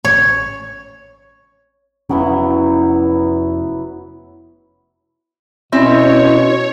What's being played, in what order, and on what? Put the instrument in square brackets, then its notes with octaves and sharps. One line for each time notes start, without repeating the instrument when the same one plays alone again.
[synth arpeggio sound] A1 [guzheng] C#5
[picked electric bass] F1 C#4 [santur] F#3 B3 E4
[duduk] B2 [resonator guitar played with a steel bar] C4 E5 [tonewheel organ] C#4 E4 [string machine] C#5